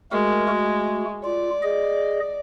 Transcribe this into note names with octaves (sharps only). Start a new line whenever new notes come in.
G#3 A3 F#4 A#4
A3 F#4
F4 D5
G#4 D#5